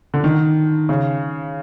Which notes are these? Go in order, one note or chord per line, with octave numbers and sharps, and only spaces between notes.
D3
D#3
C#3